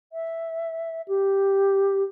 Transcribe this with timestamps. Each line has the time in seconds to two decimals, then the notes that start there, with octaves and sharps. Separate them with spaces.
0.12 E5
1.08 G4